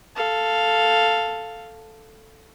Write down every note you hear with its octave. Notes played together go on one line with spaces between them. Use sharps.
A4 F5